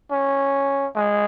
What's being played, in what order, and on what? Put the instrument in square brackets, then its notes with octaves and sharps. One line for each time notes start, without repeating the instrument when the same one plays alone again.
[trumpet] C#4
G#3